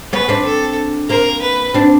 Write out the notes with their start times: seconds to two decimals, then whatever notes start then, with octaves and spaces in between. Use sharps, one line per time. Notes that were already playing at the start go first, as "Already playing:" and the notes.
0.13 B3 C#4 B4
0.29 C4 D4
0.46 A4
1.09 A#3 C4 A#4
1.42 B4
1.74 C4 D4